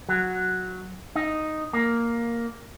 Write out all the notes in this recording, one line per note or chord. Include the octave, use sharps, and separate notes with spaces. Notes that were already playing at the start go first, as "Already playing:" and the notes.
F#3
D#4
A#3